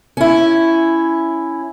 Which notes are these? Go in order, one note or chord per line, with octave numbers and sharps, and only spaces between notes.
C#4 E4